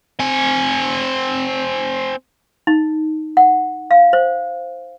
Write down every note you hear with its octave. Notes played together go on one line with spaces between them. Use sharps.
C4 G#5
D#4
F#5
F5
C5